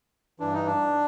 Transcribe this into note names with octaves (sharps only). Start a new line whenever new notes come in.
G2 E3 D4
D#4
D4